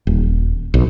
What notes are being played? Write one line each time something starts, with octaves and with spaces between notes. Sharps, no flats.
D#1
B1